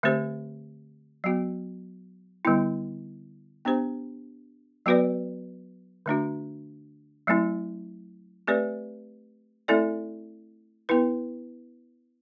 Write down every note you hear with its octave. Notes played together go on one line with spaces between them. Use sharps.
D3 A3 C4 G4 C5
F#3 B3 F#4
D3 G3 B3 E4
B3 D4 G4 C5
F#3 B3 F#4 B4 D5
D3 A3 D4 F#4
F#3 A3 C4 E4
A3 C4 G4 B4 D5
A3 C4 E4 A4 D5
B3 E4 B4